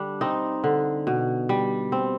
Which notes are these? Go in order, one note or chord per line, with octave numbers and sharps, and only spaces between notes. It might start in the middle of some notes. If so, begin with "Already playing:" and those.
Already playing: D3 G3 D4
C4 D#4
D3
B2
G3
C4